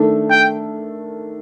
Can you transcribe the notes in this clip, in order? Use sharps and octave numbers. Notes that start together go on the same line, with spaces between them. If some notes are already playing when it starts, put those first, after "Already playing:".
Already playing: D#3 A3 D4 A4
G5